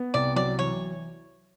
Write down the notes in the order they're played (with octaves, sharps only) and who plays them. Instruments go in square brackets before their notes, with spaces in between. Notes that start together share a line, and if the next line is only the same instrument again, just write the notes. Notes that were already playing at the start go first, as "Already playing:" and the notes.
Already playing: [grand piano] B3
[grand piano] C2 [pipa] D5
[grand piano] F#3 [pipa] D5
[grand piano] E3 [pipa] C#5